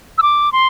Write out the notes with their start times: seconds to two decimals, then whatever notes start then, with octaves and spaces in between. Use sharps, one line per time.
0.18 E6
0.22 D6
0.52 C6